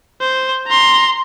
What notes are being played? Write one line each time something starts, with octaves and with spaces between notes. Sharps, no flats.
C5
A#5 C6